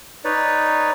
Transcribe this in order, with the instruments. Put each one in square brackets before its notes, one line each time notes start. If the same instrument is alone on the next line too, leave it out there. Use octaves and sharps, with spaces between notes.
[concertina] D#4 B4 C#5 D5